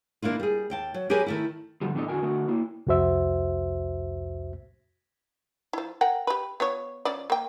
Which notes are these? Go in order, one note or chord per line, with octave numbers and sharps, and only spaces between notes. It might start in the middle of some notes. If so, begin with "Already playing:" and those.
D#3 A#3 D4 E4 F4
G3 G#4
D#2 G5 A5
F#3
F#3 G4 G#4 A#4 B4 G#5
D#3 A3 E4
G2 D3 F3 G3
A2 E3 B3 D4 A4 D#5
E2 D3 F#4 A#4 G#5
D3 A3 F#4 A#4
A#3 E4
C2 F2 F#4 C5 E5
F3 E4
A#4 F#5 G5
G4 B4
B3 F4 C#5
F3 C#4 D5
A#3 G5